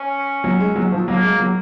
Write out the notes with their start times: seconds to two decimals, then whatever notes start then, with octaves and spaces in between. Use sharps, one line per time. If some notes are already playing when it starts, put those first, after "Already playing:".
Already playing: C#4
0.44 F#3
0.60 G#3
0.76 F#3
0.92 F3
1.08 F#3 A#3
1.23 G#3
1.39 F#3